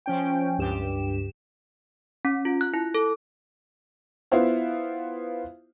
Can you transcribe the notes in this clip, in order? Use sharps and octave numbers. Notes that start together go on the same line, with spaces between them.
F3 C#4 G5
C#2 G2 G4 E7
C#4
F4
F#6
E4
A4
B3 E4 F4 C5 F5